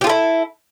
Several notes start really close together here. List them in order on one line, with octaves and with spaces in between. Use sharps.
G4 F4 A4 E4